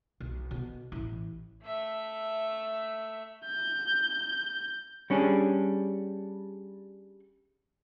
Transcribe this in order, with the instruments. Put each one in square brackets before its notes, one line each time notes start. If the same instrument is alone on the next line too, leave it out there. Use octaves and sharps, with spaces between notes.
[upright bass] B1
B2
A1 E4
[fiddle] A3 E5
[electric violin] G6
[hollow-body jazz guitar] G3 C#4 D4 G#4